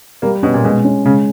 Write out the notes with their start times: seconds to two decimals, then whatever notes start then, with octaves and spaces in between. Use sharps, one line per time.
0.22 G3 A#3
0.43 B2 C#4
0.54 A#2
0.64 B2 G#3
0.84 C#4
1.05 C#3 G#3